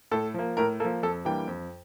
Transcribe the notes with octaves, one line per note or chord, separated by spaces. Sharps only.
A2 A4
F3 A#3
A2 A#4
F3 A#3 A4
F2 A4
E3 G3 A#3 D4 G5
F2